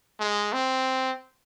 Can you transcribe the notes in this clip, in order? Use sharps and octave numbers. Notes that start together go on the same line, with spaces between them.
G#3
C4